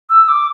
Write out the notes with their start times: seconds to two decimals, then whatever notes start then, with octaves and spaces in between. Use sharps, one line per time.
0.10 E6
0.24 E6
0.28 D6